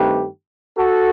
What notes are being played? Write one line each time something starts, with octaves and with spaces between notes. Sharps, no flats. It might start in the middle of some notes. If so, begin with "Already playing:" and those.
Already playing: G2 D#3 A3 C4 G4 B4
F#4 A4